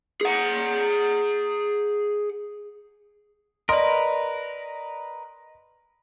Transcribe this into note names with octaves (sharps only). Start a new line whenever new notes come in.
G#4 F#5
A#4 B4 D5 D#5 C6